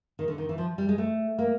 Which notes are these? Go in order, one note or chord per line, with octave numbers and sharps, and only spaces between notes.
D#3
D3
D#3
E3
F3
G3
G#3
A3
A#3